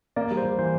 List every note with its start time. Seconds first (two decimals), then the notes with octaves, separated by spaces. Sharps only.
0.16 A#3 D5
0.31 G3
0.37 C5
0.44 G3
0.58 E3 C5